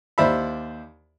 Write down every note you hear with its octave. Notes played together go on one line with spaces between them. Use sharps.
D#2 C5 D5 E5 B5